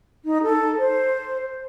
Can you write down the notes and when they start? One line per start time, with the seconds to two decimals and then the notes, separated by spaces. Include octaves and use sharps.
0.24 D#4
0.43 A4
0.78 C5